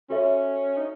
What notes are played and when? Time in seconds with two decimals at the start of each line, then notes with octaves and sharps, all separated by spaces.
0.10 C#4 F#4 A4 C#5 E5
0.78 D#4